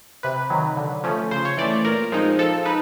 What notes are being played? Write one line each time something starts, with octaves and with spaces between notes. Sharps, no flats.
C3 B4
D#3 F#3
D3
F3 A3 C#4
C#3 C5
C#5
E3 A3 D5
A#2 A#4
F3 G#3 C4 D#4
F3 A4
D#4 B4